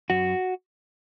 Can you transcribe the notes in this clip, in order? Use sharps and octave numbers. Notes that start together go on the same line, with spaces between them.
F#2 F#4